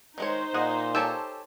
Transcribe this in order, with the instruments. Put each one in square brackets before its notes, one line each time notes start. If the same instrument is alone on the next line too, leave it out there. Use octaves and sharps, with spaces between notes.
[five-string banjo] D#3 G#3 C#5 [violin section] D#4 C5
[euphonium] A#2 [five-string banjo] G#4 [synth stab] D#5 F#5
[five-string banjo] G4 A4 C#5 [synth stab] G#5 A5 E6